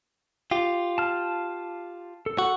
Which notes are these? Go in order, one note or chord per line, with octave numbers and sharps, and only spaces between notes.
F4 G4
A5 F6
A4
F#4